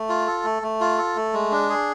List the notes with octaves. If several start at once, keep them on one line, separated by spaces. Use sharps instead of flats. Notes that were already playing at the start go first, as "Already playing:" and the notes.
Already playing: A3
F4
A4
A3
A3
F4
A4
A3
G#3
D4
G#4